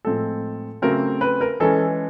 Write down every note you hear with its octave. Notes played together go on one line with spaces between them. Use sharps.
A2 F3 G#3 C4 A4
C#3 F#3 A3 C4 A#4
B4
A#4
E3 G#3 C#4 A4